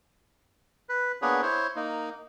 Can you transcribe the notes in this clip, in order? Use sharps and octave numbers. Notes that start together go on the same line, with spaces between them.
B4
A#3 B3 D4 G#4 B4 C#5
E4 C5 C#5
A#3 D#4